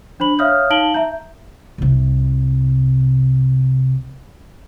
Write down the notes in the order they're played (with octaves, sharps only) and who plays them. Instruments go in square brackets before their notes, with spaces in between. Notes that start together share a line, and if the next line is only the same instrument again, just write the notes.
[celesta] D4 C5 B5 F#7
C#5 E5 F5 D#6 F6 G6
D#4 F5 A5 D7 F#7 G7
E5 A#5 G6
[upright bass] C2 C3